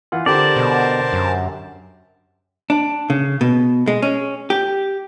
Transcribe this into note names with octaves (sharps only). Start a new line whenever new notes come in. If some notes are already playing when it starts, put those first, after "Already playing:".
E3 F4 F#5
D3 G4 A#4 C5 D5 A5
B2
F#2
D4
C#3
B2
G#3
C#4
G4